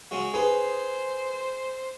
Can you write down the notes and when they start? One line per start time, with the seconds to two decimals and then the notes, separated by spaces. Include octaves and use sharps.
0.11 C#3 G#3 C#4 F#4
0.34 D#4 G#4 B4 C5